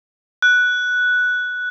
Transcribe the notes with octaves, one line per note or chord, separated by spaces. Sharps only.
F#6